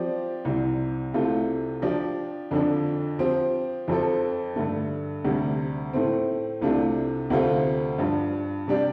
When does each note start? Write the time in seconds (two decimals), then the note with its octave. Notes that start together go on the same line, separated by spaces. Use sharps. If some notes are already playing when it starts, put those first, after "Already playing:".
Already playing: F3 C4 G4 D5
0.45 C2 C3 G3
1.14 C2 C3 A3 F4
1.82 F3 D4 G4 D5
2.51 F2 D3 F3 D4
3.19 F3 C4 G4
3.88 F2 F3 C4 A4
4.56 G2 D3 A3
5.25 D2 C3 G3 D4
5.93 A2 A3 C4
6.61 C2 C3 A3 D4 F4
7.30 D2 C3 A3 C4 F4
7.98 G2 F3 D4
8.67 C3 G3 D4 G4 D5